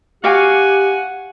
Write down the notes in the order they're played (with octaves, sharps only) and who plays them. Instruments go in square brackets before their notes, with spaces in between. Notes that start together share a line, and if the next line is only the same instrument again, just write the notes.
[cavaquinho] F#4 F5 D6 [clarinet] G4 [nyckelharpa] F#5 [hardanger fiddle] G#5